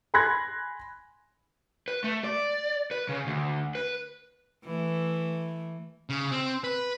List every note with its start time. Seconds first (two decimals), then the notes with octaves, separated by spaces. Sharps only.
0.14 G#5 B5 C6 F#6 G#6 A#6
1.88 B4
2.04 A3
2.24 D5
2.91 B4
3.09 C#3
3.27 D2
3.75 B4
4.65 E3 A3
6.09 C#3
6.31 C4
6.64 B4